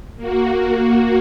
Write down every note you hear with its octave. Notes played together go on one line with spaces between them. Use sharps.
A#3 F#4